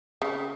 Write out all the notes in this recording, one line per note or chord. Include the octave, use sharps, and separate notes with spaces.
C#3